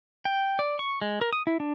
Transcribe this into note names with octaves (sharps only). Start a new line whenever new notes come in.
G5
D5
C#6
G#3
A#4
D#6
E4
D4